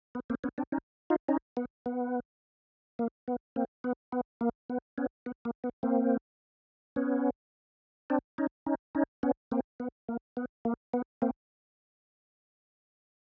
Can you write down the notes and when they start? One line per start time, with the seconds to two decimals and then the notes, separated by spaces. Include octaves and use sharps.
0.15 B3
0.30 A#3 C4
0.44 B3 C#4
0.58 C4 D4
0.72 C#4 D#4
1.10 D#4 F4
1.29 C#4 D#4
1.57 B3
1.86 B3
2.99 A#3
3.28 B3
3.56 A#3 C4
3.84 B3
4.12 B3
4.41 A#3
4.70 B3
4.98 B3 C#4
5.26 B3
5.45 A#3
5.64 B3
5.83 A#3 C4
6.96 B3 C#4
8.10 C4 D4
8.38 C#4 D#4
8.66 C#4 D#4
8.95 C#4 D#4
9.23 B3 C#4
9.52 A#3 C4
9.80 B3
10.09 A#3
10.37 B3
10.65 A#3
10.94 B3
11.22 A#3 C4